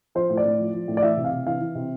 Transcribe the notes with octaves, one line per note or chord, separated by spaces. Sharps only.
F3 C5
A2
D5
A2
F3
F3
A2
D5
E3 E5
C3
F5
C3
E3 F5
E3
C3